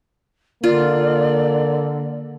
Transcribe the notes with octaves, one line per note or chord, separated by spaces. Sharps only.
D3 A#3 F4 D5